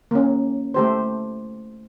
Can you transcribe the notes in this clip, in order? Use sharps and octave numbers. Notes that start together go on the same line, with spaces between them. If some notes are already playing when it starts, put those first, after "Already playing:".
A#3 C#4
A3 G4 C5